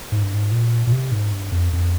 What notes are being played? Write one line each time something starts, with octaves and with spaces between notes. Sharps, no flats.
G#2
G2
G#2
A#2
A#2
C3
G#2
G2
F2
F2